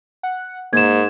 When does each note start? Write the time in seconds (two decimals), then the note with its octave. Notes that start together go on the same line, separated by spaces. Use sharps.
0.23 F#5
0.73 G#2 A#3 G#6 E7